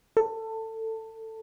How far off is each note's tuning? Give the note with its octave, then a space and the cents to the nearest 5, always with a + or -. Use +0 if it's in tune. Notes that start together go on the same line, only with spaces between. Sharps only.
A4 +20